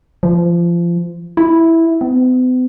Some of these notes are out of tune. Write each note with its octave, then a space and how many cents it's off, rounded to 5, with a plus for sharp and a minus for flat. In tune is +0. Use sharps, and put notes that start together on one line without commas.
F3 -25
E4 -5
B3 +45